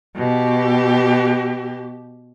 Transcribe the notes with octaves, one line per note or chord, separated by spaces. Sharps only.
B2 G4